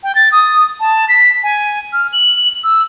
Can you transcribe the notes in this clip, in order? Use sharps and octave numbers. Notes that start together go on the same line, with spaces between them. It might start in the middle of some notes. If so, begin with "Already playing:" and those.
G5
A6
D#6
A5
B6
G#5
F6
F#7
E6